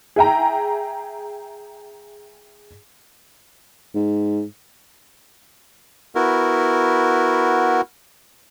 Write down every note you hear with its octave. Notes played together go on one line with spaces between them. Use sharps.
G#4 E5 G5 A#5
G#2
B3 E4 F#4 A#4